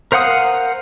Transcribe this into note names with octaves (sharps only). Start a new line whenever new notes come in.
A#4 C5 F5 F#5 D#6